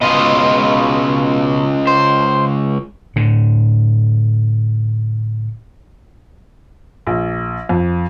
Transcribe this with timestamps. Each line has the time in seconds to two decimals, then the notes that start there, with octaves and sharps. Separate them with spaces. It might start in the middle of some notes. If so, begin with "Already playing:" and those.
0.02 C#2 B2 F4 D#5
1.87 C5
3.16 A2 D3
7.07 A#1
7.69 F2